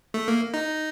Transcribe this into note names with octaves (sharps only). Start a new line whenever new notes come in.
A3
A#3
D#4